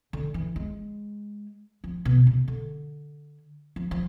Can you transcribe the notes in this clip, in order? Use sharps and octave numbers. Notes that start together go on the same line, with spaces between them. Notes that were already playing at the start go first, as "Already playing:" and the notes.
D3
E3
G#3
F3
B2
C3
D3
F3
F3